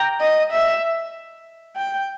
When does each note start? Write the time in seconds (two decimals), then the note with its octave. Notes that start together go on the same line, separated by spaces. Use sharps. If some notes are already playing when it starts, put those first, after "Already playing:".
Already playing: G5 A#5
0.21 D#5
0.52 E5
1.76 G5